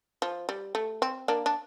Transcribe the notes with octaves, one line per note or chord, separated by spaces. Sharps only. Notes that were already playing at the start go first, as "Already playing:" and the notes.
F3
G3
A3
C4
A#3 D4
D4